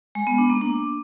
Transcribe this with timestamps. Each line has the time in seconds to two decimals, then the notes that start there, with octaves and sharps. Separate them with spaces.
0.15 G#3
0.27 B3
0.38 D4
0.50 A#3
0.61 D4